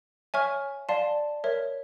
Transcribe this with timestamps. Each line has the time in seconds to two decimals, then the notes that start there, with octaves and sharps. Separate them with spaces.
0.34 C#5 E5 G#5 C#6 F6
0.89 D5 F5 A5 C6
1.44 A#4 C#5 E5